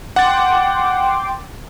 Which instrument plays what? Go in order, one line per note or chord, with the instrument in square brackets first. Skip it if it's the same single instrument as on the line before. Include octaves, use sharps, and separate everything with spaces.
[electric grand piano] F#5 A6 [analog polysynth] G5 C6 D6